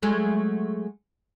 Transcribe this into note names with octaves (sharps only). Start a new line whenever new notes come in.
F#3 G#3 A3